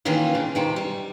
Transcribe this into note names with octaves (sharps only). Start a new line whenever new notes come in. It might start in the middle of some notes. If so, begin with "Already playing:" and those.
D#3 E3 A#3 C#4 F4
C#3 D4
C3 D#3 G5
G3